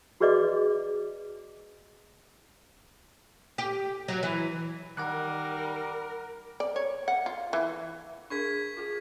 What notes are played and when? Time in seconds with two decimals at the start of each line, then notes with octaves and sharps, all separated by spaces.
0.20 F#4 G#4 B4 D5 D#5 D6
3.58 G4
4.08 F#3
4.23 E3
4.97 D#3 G3 A#4 F#5 D6 F#6
6.60 D5
6.76 C#5
7.08 F#5
7.26 F4
7.53 E3
8.30 D4 G#4 A#4 C#6 G#6 B6
8.77 F4 G#4